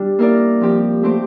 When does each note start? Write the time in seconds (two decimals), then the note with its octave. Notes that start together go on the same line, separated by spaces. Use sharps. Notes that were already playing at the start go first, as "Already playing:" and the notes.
Already playing: G3 D4 G4
0.19 A#3 E4 A#4 D5
0.61 F3 C4 G4
1.03 A3 C4 G4 C5